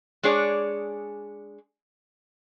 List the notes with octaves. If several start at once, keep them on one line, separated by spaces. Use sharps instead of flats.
G#3 D4 G#4 C#5 D5